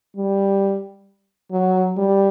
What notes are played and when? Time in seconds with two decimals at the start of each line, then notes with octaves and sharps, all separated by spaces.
0.17 G3
1.52 F#3
1.97 G3